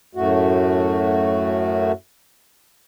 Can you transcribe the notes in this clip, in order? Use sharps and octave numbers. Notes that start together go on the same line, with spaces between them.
F#2 A2 A3 F#4